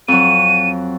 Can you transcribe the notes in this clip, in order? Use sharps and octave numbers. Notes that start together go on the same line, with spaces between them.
F2 F#3 D#7